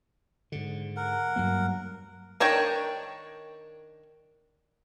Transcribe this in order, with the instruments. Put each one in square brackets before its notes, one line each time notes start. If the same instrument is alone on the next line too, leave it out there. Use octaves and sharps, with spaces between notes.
[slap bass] G#2 D3
[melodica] A#4 F#5
[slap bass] G2 F#3 A#3
[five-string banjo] D#3 D4 A#4 C#5 G5